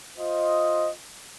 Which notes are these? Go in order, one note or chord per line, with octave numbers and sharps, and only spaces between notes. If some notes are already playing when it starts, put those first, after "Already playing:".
F4 C5 D#5